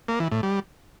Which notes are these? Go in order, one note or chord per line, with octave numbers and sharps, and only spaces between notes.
A#3
E3
A2
G3